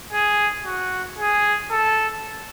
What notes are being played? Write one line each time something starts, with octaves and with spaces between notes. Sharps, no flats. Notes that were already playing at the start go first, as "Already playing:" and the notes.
G#4
F#4
G#4
A4